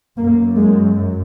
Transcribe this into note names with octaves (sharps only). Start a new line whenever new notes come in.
F#2 A#3
G#3